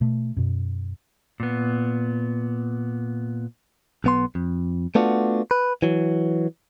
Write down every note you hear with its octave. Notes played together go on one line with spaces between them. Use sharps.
B2 A3
F#2 B2
A#2 B3
B1 B3 C6
F2
A3 B3 D4 F4 F#4
B4
E3 F#3